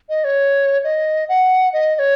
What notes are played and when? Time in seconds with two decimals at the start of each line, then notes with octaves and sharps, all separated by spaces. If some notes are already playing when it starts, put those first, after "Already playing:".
0.09 D#5
0.24 C#5
0.84 D#5
1.29 F#5
1.73 D#5
1.96 D#5
1.99 C#5